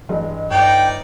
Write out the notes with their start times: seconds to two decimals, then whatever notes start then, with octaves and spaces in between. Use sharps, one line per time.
0.09 G2 E3 G#3
0.51 G1 G2 D#4 D5 G5